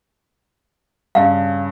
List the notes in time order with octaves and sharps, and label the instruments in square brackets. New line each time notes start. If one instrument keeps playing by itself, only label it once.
[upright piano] G2 C#3 [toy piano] F5